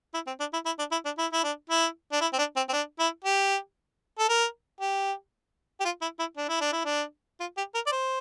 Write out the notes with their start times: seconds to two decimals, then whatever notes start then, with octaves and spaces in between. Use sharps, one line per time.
0.14 E4
0.27 C4
0.40 D4
0.53 E4
0.66 E4
0.79 D4
0.92 E4
1.05 D4
1.18 E4
1.33 E4
1.43 D4
1.70 E4
2.12 D4
2.21 E4
2.33 C4
2.38 D4
2.56 C4
2.69 C4
2.73 D4
2.99 E4
3.25 G4
4.19 A4
4.29 A#4
4.81 G4
5.80 G4
5.85 F4
6.02 E4
6.19 E4
6.37 D4
6.49 E4
6.61 D4
6.73 E4
6.85 D4
7.40 F4
7.57 G4
7.74 A#4
7.86 D5
7.92 C5